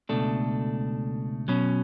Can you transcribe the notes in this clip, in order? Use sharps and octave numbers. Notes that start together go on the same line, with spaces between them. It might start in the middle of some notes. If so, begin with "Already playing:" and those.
C#2 B2 A3 D4 A4
B2 F#3 C#4